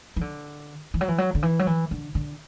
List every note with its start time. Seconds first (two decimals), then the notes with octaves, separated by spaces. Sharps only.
0.17 E3
0.21 D3
0.94 E3
1.01 F#3
1.08 E3
1.18 F#3
1.35 D3
1.43 E3
1.59 F#3
1.67 E3
1.91 D3
2.15 D3